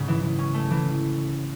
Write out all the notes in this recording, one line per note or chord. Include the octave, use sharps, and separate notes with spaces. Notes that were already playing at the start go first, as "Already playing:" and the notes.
Already playing: G#2 C#3
E3
E3
C#4
A3
E3